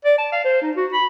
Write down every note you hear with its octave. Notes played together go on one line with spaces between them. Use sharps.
D5
A5
F5
C5
D#4
F#4
B5